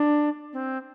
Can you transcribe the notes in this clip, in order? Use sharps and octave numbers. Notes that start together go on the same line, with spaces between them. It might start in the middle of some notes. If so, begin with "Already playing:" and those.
Already playing: D4
C4